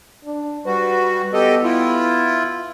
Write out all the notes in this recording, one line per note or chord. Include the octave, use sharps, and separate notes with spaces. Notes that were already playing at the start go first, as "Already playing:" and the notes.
D4
G3 F#4 B4
B3 G4 A4 D#5
E4 F4